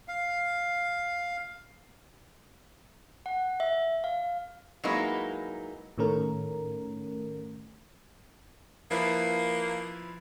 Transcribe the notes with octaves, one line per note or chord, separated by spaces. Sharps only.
F5
F#5
E5
F5
F#3 G#3 A#3 D#4 E4 B4
A2 D#3 A3 C#4 A#4
F3 A#3 E4 B4